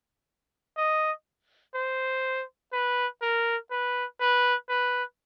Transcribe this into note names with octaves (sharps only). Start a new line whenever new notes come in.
D#5
C5
B4
A#4
B4
B4
B4